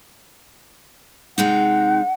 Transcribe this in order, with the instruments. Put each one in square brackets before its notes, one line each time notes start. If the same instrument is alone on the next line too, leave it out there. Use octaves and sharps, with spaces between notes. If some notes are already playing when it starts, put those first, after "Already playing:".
[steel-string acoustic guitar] C3 G#3 D#4 [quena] F#5